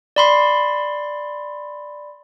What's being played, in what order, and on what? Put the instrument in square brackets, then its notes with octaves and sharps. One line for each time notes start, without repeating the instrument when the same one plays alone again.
[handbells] D5 B5 C6